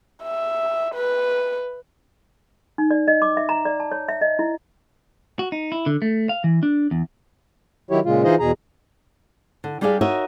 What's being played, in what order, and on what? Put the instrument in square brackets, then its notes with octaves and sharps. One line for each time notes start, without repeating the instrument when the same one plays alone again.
[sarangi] E5
B4
[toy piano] D#4
D5
D#5
D6
E5
A#5
D5
A5
C#5
E5
D#5
E4
[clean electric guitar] F#4
D#4
E4
D3
A3
F5
E3
D4
E2
[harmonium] D#3 F#3 E4 G4 C#5
A#2 C#3 G#3 F4
E3 D#4 F4 G#4 C5 D#5
E2 B2 G#4 A#5
[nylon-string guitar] D3
G3 D4 G4 G#4 D5 F5
D#4 F#4 A#4 C#5 D#5 E5